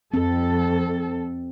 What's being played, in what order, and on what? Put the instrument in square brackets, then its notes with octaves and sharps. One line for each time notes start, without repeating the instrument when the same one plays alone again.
[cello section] F2 A4 [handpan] C4